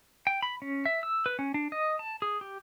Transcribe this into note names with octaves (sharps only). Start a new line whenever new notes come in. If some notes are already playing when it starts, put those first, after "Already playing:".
G5
B5
C#4
E5
E6
B4
C#4
D4
D#5
A5
G#4
G4